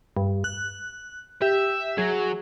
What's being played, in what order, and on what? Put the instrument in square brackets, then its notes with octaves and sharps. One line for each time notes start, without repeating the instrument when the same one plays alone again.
[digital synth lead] G2
F#6
[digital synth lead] G4 [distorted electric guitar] E5
[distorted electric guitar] F#3 [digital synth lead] G#4